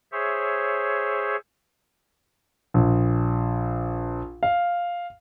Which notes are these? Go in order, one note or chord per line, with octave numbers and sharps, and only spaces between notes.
G#4 C5 C#5 E5
A#1
F5